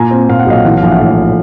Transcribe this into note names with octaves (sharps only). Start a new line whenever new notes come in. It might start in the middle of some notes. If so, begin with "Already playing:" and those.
Already playing: A#2 G#5 A#5
C4
A#2 F5
F#5
B1 D#5 F5
E3 F#5
F5
A#1
E5 F#5
A2